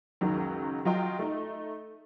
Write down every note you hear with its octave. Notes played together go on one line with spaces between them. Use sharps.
C#2 F#2 D#3 F#3
F#3 F4 D#5 G5 C6
A3 D#4